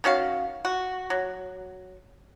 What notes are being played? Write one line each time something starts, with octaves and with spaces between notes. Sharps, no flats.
D#3 C#4 F#4 F5
F#4
F#3